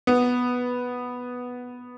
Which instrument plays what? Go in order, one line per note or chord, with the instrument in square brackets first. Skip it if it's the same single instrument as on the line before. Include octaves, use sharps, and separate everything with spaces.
[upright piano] B3